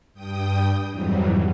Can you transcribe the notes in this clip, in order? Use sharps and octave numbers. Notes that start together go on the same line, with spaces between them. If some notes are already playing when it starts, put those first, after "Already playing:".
G2 G5 D#6
F2 G#2 E3 F#3 G3